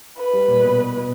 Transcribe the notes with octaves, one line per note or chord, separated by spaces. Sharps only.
B4
G3
A#2
B2
B2